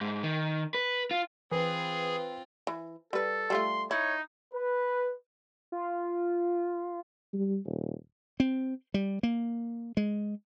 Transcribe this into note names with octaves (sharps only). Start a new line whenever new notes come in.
G#2
D#3
B4
F4
E3 C4 F4 G#4 B4
E3
G3 A4 B4
G3 A3 F4 C6
D#4 E4 C#5
B4
F4
G3
D#1
C4
G3
A#3
G#3